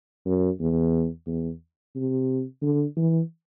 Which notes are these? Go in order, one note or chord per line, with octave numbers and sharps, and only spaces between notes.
F#2
E2
E2
C3
D3
E3